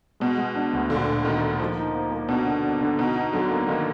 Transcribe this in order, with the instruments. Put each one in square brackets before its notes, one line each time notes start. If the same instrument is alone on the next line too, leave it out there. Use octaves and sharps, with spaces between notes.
[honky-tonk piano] B2 [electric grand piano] G#3
[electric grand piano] G#3
D4
D2
[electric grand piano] A#2 [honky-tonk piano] D3
[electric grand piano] A#2
[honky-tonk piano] D#3 [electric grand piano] D#4
[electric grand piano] A#2
[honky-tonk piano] F3 [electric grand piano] A#3
[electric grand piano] D#4
A#3
A#3
[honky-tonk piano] B2 [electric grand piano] D4
[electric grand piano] D3
D4
D3
[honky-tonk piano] B2 [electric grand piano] D#4
[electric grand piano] D#4
[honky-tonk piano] D3 [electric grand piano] F#3
[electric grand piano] A#3
[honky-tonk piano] D#3 [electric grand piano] A#3